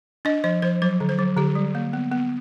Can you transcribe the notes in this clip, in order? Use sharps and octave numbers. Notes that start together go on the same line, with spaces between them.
D4 D#5
F3 D#5
F3 C5
F#3 C5
D3
C5
F#3
D3 G4
G3
A#3
B3
B3